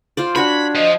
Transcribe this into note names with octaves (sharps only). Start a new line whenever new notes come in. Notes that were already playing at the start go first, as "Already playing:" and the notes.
F4 C5 D5
D4 F4 F#4 C#5 B5
F3 D#5